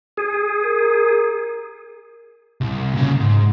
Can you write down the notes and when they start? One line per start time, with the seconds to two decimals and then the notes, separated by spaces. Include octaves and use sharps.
0.17 G#4
0.64 A#4
2.61 C2
2.95 A#2 C#3
3.20 G#2